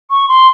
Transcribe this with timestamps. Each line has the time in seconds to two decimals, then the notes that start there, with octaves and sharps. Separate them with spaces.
0.10 C#6
0.28 C6